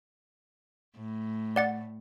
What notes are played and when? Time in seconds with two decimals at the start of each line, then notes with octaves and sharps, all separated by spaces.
0.97 A2
1.56 D5 F#5 A6